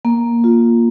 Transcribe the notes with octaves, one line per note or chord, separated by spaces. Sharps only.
A#3
F4